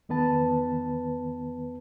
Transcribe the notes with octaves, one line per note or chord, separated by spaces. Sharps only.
E2 D#3 B3 B4 A5